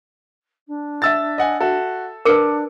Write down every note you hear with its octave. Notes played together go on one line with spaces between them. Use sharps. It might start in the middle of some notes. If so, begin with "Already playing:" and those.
D4
E5 E6 A6
D#5 F#5 G#5
F#4 A4 E5
D4 A#4 B4 D6 C#7